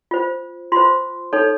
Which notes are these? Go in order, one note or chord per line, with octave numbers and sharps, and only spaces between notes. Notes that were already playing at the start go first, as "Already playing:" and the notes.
F4 C5
F4 C5 C6
D#4 A4 C#5